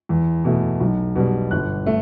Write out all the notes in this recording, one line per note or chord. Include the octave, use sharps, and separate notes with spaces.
E2
B2 A3
B1
B2 G3
G1 F#6
A3